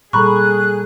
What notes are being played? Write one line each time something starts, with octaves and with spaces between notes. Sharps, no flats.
A#2 G3 G#4 A4 A#5 B5 C#6 F#6